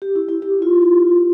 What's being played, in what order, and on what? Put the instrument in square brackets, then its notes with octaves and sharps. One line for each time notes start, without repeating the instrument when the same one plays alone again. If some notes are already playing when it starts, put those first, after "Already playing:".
[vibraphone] G4
E4
E4
G4
F4
F4